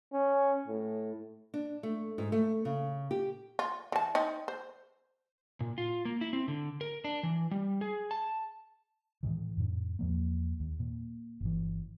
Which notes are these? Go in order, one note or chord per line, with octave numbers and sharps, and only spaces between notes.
C#4
A2
D4
A3
G#2
A3
C#3
G4
F4
E3 A5
C4 D#4
C5
A#2
F4
A#3
E4
C4
D3
A#4
D4
E3
G3
G#4
A5
A2 D#3 E3
F2 A2
E2 F3 A#3
D#2
A#2
G1 E3